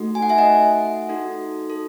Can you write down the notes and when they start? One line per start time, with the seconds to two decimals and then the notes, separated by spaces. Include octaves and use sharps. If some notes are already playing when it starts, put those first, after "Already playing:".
Already playing: A3 D#4 F#4 A4
0.15 G#5
0.22 F#5
0.29 E5 G#5
0.38 D#5 F#5
1.09 D#4 F#4 A4
1.70 A4